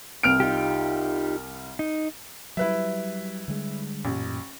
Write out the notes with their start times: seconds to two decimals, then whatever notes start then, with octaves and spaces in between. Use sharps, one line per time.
0.23 C2 F6 D7
0.40 D#4 F4 G4
1.79 D#4
2.57 F#3 G3 E4 B4 E5
3.48 D3 G3 G#3
4.05 A1 F#2 A#2